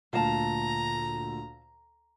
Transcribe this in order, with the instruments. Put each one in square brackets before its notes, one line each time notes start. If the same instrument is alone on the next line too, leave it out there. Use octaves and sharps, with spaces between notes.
[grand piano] D2 A#2 [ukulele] F5 A5 [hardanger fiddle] A#5